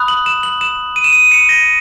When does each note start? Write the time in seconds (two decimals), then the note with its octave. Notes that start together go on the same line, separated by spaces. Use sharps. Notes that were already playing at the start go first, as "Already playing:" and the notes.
Already playing: B5 D#6 F#6
0.08 F#7
0.26 E7
0.43 F#7
0.61 E7
0.96 D#7
1.04 E7
1.13 D#7
1.32 C#7
1.49 A#6